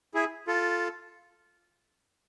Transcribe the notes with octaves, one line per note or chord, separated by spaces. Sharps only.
E4 G#4
F4 A4